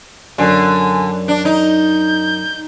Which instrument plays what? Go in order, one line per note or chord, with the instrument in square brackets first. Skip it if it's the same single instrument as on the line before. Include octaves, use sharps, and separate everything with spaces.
[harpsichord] F#2 [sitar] D3 [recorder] G#5
[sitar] D4
[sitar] D#4 [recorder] G6